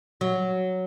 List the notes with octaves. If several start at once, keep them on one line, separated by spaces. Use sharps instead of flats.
F#3